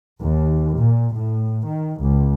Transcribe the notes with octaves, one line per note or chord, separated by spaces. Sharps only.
D#2
A#2
A2
D#3
C#2